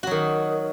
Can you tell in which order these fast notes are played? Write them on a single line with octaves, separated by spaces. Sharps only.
F#4 F#3 D#3